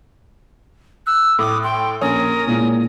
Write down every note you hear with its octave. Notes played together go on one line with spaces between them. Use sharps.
E6 F#6
A2 D6 D#6
G5 C6
A#1 C#4 A#4 D#6
A#2 G#3 E4